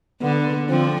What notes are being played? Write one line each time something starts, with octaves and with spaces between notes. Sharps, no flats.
D3 B3
D3 F3 C4